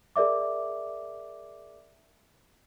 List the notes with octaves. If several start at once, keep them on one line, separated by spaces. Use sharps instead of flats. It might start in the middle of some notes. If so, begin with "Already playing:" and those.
G#4 A#4 D5 E5 D6